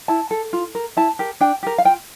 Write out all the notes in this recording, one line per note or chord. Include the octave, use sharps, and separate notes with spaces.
E4 A5
A4
F4
A#4
E4 A5
G4 A#4
D4 G5
G4 A#4
F5
F4 G5